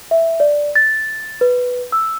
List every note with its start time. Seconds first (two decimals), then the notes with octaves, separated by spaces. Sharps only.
0.11 E5
0.40 D5
0.76 A6
1.41 B4
1.92 E6